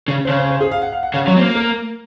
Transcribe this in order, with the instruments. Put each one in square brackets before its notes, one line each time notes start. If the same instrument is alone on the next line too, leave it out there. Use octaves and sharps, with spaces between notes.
[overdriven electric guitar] C#3
[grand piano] C5
[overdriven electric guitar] C#3 [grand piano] C#5
[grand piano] C5
C5
G#4
F5
F#5
F5
F#5
[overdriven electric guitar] C#3 [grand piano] F5
[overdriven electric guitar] F#3 [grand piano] C#5
[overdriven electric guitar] C4
A#3
[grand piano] A#4